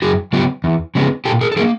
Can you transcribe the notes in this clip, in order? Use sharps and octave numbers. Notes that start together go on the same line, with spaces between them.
F#2 F#4 G#4
C#3 F#3 B3 F4 G4
E2
C#3 F3 G#3 B3
A#2 G4 A4
G#4 A#4
A4
F3 A#3 G#4 A#4